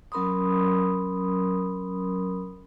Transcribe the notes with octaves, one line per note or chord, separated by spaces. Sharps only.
F#3 C#4 A#4 B5 C6 D#6